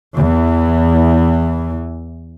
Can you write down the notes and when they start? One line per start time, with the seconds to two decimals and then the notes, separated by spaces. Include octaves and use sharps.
0.15 E2 E3